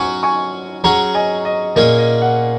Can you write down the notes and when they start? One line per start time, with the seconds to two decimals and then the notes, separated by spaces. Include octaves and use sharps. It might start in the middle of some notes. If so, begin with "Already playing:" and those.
Already playing: F#3 C#4 F#4 G#5 C#6
0.23 G#5 C#6
0.84 F#3 C#4 G#4 C#5 F#5 A#5
1.15 D#5 G#5
1.45 D#5
1.76 A#2 A#3 C#4 G#4 D#5
1.99 D#5
2.22 F#5